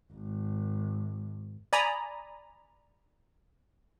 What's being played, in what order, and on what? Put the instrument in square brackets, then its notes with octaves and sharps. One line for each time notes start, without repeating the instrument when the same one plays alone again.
[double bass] G#1
[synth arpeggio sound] D5 G#5 A#5 B5 D#6